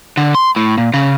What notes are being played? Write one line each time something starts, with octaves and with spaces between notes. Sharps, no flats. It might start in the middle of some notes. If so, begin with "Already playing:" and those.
D3
C6
A2
A#2
C#3